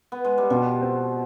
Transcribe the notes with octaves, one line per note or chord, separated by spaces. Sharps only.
B3
G#3
G3
B2 F3
C4